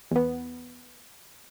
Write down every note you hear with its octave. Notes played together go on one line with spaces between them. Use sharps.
E2 B3